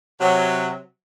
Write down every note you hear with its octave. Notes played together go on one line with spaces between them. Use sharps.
C3 F#3